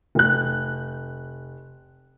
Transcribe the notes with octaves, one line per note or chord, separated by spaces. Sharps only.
F1 F#6